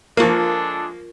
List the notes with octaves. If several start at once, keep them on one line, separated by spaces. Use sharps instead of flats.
F3 G#3 A#3 D4 F4 A4 A#4